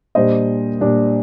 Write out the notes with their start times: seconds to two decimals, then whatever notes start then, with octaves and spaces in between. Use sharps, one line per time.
0.15 A#2 G3 D4 C5 D#5
0.81 A#2 G3 D4